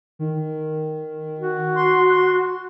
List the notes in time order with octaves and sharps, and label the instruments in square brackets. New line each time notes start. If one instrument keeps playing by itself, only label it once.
[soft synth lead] D#3
[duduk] F#4
[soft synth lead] C6